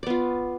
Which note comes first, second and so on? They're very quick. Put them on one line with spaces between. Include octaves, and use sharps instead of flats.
D5 B3 F4